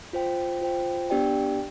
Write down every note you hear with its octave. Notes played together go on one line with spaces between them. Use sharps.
F4 C5 G5
F4 C5 G5
B3 D4 G4 D5 G5